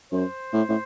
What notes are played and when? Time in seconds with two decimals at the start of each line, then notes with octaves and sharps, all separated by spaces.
0.11 F#2 C5
0.53 A2
0.69 A2